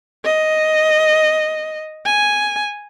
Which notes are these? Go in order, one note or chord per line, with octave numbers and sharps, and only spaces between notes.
D#5
G#5